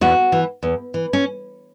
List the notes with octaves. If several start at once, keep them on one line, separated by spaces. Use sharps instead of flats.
E2 F#4
E3
E2
E3
C#4